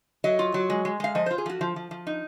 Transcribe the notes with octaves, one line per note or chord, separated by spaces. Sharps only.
F#3 D#5
F4
F#3
G#3
G#3
G#3 F5
F3 D#5
F4 C5
G#4
F3 F#4
F3
F3
F3
D#4